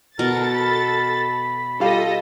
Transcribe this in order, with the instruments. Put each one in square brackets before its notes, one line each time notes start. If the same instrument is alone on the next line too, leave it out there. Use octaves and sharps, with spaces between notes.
[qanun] B2 [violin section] A4 A6 [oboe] A#4
[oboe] B5
[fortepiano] G3 F4 F5 [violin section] A4 D#5